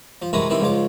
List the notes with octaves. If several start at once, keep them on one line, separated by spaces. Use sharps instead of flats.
F3
C3 E3 G#3 F#4 A#4 B4
D#3 E3 G3 C4 E4
C#2 G#2 F3 C#5 D6